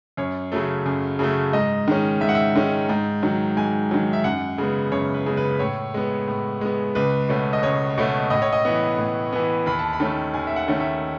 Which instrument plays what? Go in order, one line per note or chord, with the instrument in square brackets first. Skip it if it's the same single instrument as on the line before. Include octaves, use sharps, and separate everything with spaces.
[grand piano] F#2 C#5
C#3 F#3 A3
F#2
C#3 F#3 A3
G#2 D#5
D#3 G#3 C#4
G#2 E5
F#5
E5
D#3 G#3 C#4
G#2
D#3 F#3
G#2 G#5
D#3 F#3
E5
F#2 F#5
C#3 G#3 B3
F#2 C#5
B4
C#3 G#3 B3
B4
B4
A2 C#5
G#3 B3
A2
G#3 B3
C#2 B4
B2 A3 C#4
D#5
C#2 C#5
B2 A3 C#4
A2 D#5
C#5
D#5
E3 B3
A2
E3 B3
D#2 B5
A5
B5
D#3 A3 C#4
D#2 G#5
E5
F#5
D#3 A3 C#4
E5